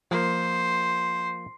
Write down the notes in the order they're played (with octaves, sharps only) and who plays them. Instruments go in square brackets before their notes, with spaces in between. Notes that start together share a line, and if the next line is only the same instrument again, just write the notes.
[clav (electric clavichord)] F3 A#3 [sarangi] C5